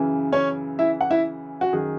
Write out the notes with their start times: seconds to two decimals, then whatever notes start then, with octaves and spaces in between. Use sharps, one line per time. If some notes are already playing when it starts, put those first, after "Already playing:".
Already playing: F#2 C#3 E3
0.32 C#4 C#5
0.79 E4 E5
1.01 F#5
1.11 E4 E5
1.61 F#4
1.73 F#2 D#3 F#3 G#4